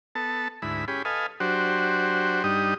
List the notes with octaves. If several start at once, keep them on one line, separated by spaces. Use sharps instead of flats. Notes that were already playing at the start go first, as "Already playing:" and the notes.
B3 A4 A5
D2 G#2 E4 B5
C#4 G4 G#4 B5
A4 B4 D#5 F5 G#5
F#3 D4 F#4 G4 C5
G2 G3 D4 D#4 G4 D#6